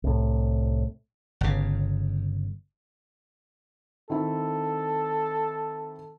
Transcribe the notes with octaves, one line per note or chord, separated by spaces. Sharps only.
C2 A2
G1 C#3
D#3 C4 E4 A4